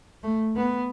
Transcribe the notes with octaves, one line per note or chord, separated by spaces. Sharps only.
A3
B3